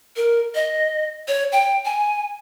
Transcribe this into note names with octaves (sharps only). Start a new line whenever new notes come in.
A#4
D#5
C#5
G5
G#5